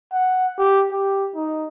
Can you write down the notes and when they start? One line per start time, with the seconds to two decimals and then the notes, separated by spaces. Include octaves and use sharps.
0.13 F#5
0.58 G4
0.92 G4
1.35 D#4